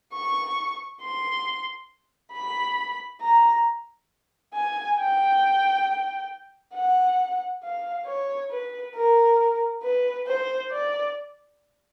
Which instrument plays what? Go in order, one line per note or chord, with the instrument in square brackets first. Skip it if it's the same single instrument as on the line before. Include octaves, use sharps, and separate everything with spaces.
[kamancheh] C#6
C6
B5
A#5
G#5
G5
F#5
F5
C#5
B4
A#4
B4
C5
D5